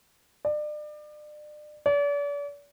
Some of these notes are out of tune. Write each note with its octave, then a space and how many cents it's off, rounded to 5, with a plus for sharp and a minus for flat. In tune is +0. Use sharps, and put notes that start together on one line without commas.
D5 +35
D5 -40